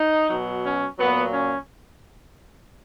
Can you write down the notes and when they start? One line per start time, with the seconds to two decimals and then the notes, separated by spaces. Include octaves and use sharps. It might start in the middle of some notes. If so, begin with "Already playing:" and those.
Already playing: D#4
0.29 B2 F#3
0.64 C#4
0.98 A#2 F#3 B3
1.33 C#4